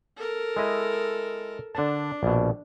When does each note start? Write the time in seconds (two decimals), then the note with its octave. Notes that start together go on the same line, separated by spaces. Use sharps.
0.17 A4 A#4
0.57 G#3 E4 D#5
1.75 D3 D4 A5
2.23 A#1 B2